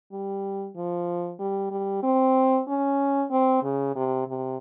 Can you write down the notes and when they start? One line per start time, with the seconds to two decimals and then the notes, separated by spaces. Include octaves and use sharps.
0.12 G3
0.76 F3
1.39 G3
1.71 G3
2.03 C4
2.68 C#4
3.31 C4
3.63 C#3
3.96 C3
4.28 C3